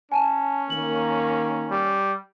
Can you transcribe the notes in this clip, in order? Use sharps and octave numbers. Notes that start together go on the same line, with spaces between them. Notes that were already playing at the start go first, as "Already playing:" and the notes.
C#4 G#5 A5
D#3 A#3 F#7
G3